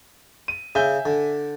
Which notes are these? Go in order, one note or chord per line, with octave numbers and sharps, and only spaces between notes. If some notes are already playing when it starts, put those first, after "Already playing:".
D#7
C#3 E5 G#5 G6
D3